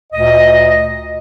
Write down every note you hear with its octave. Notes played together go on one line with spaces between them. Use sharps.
D2 A#2 D#5